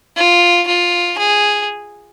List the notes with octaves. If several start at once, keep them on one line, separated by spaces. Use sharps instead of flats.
F4
F4
G#4